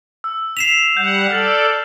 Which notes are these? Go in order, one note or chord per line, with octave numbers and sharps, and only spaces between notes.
E6
B6 C7 E7 F7
G3 F#5 G6
A4 D5 F6 A6 F#7